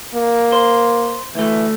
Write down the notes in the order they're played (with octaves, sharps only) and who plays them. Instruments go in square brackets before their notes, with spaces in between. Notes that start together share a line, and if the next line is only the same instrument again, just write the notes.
[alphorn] A#3
[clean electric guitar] C5
[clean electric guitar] D2 A3 [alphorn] E3